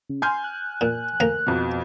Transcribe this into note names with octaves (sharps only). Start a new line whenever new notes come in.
C#3
G#5 C6 F6 G6
F#6
A#2
D2 A#3 A#5
F2 B2